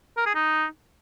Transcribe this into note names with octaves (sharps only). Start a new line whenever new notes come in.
A#4
G#4
D#4